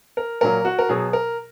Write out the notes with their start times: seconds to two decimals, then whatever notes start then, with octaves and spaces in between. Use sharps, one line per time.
0.17 A#4
0.41 A#2 F#3 A#4
0.65 F#4
0.79 A#4
0.89 B2 F#3 G#4
1.13 A#4